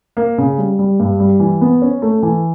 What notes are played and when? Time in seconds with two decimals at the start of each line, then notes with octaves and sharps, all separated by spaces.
0.17 A#3
0.38 C#3
0.58 G3
0.79 G3
1.00 G2
1.20 G3
1.40 E3
1.61 B3
1.82 C#4
2.02 A3
2.23 E3